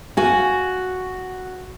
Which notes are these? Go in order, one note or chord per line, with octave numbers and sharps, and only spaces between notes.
F#4 F5 G#5